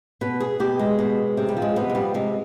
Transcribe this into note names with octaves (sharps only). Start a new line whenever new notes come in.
B2 B4
G#4
B2 G4
G#3
B2
C3
G3
F3
G#3
C3 B3
G#3
F3 G3
C3 G#3